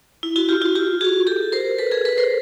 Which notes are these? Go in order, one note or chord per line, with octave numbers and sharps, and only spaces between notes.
E4
E4 F#4
F4 G4
E4 F#4
F4 G4
F#4 G#4
G4 A4
A#4 C5
A4 B4
G#4 A#4
A4 B4
A#4 C5